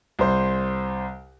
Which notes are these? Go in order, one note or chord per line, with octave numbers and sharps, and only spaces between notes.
C2 C5